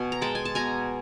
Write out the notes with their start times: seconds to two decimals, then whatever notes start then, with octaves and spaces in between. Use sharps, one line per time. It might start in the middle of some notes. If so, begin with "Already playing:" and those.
Already playing: B2 G#5
0.12 A#5
0.21 G#3 G5 A5
0.35 G#5
0.45 A5
0.55 B2 G#5 A#5